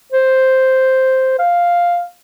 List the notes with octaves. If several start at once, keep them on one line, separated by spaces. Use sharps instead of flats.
C5
F5